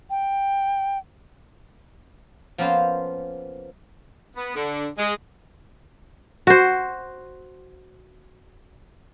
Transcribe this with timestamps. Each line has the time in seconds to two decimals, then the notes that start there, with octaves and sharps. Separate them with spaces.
0.10 G5
2.58 F3 A#3 B3 C#4 F4 C5
4.35 B3
4.55 D3
4.98 G#3
6.47 F#4 C5